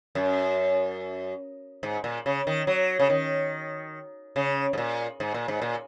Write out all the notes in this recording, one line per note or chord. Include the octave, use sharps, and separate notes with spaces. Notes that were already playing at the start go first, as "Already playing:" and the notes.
F#2
G#2
A#2
C#3
D#3
F#3
C#3
D#3
C#3
G#2
A#2
G#2
A#2
G#2
A#2